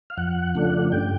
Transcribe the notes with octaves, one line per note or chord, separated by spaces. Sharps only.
F5
F2 F#5
C#3 F3 A3 D4
G2 G5